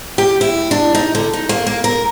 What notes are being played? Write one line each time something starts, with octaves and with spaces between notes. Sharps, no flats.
G4
E4
D4
D#4
D3
D#4
A#3
A#3
A#4